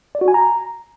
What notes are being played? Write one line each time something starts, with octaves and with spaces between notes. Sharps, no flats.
D5
F#4
G#5
A#5